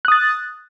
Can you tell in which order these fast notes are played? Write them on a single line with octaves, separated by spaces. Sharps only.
F#6 D#6 A6